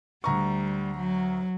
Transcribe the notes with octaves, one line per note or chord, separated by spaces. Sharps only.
D2 G3 A#5 C#6
F#3